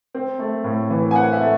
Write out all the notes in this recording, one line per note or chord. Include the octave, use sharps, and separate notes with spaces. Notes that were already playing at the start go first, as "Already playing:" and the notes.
C4
A3
A2
E3
G#5
C4 F#5
E5
A3